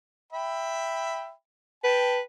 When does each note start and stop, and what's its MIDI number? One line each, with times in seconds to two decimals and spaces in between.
0.33 1.31 76
0.33 1.31 79
0.33 1.31 83
1.84 2.21 71
1.84 2.18 79
1.84 2.18 81